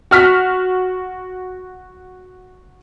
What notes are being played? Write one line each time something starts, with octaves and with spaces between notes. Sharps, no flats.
F#4 F6 B6